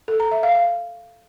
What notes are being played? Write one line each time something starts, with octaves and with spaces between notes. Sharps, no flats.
A4
A#5
E5
F5
F5